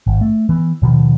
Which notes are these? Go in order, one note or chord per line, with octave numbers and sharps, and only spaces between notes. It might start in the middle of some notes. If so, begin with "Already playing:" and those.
G#1
A3
E3 B3
D#2 B2 D#3 F3